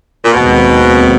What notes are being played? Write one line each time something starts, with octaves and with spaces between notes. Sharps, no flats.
A#2
D#2 B2 D#3 G#3 C4